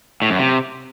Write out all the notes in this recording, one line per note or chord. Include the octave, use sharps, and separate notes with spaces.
A2
F#2
C3